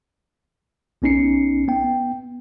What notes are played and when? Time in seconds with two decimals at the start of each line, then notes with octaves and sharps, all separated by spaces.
1.02 B1 B3 C#4 D#4 C7 C#7
1.68 B3 G5